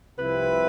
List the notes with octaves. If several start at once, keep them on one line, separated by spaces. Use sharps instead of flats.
C2 C3 F3 C4 E4 B4